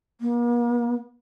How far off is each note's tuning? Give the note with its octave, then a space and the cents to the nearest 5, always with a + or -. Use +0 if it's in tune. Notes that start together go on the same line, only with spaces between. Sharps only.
A#3 +45